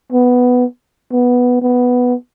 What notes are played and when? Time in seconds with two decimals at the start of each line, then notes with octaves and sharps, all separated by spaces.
0.12 B3
1.12 B3
1.62 B3